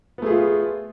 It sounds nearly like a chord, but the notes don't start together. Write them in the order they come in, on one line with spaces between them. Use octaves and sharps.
B3 A3 G#4 F4